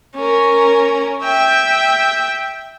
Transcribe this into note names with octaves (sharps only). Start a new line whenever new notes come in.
C#4 A#4
E5 G5